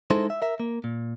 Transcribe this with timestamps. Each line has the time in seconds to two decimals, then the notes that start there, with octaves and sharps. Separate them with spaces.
0.10 G#3 D#4 E4 A4 C5
0.30 E5
0.42 A#4 E5
0.60 A#3
0.84 A#2